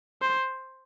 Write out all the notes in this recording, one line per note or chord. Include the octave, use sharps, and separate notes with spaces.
C5